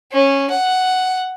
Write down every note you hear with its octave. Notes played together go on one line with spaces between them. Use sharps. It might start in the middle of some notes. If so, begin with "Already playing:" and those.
C#4
F#5